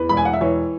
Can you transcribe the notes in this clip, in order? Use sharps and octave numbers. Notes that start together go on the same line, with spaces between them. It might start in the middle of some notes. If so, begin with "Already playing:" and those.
Already playing: E2 B4
E1 B5
G#5
F#5
E5
E3 C#5